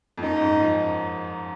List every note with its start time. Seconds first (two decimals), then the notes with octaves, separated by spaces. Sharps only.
0.18 F2
0.22 F#2 D#4
0.36 G#2
0.41 F#2
0.61 F3